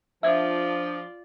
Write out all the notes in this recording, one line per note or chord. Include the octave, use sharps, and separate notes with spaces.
F3 D4 F4 D5 E5 G#6